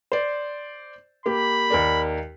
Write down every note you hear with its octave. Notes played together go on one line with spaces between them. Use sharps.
C5 D5
A#3 G4 B5
D#2 A#4 D5